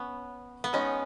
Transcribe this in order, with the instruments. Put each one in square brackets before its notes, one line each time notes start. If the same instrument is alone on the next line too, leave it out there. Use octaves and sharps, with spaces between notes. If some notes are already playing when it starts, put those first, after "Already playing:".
Already playing: [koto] B3 [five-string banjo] C#4
[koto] B3
[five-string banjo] D#3 G#3 D#4 [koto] C#4